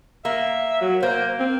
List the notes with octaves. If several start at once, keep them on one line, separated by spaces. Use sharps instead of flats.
A#3 E5
F#3
A#3 C5
C4